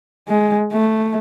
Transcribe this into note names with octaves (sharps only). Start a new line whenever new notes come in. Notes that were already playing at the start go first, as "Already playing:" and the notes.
G#3
A3